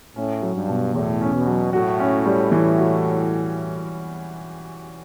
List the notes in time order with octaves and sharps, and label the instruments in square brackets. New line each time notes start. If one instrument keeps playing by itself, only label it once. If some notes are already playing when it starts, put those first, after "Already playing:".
[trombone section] A2 [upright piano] C#4
[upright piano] F#3
[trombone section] G2
[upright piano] B2
[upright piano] E2 [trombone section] A2
[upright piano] C#4
[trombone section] B2
[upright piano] F#3
[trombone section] A2 [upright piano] F#4
[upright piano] C#4
G3
E3
F#4